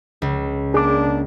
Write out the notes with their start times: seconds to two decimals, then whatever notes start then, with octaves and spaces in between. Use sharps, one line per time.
0.22 C#2
0.74 A#3 D4 G#4 D6